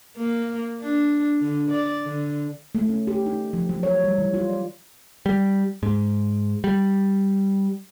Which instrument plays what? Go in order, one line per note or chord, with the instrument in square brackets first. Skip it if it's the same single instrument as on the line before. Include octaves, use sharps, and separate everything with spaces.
[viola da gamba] A#3
D4
D3
D5
D3
[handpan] A3
C#4
G4
D#4
F3
F#3
C#5
G3
E3
F4
D5
[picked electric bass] G3
G#2
G3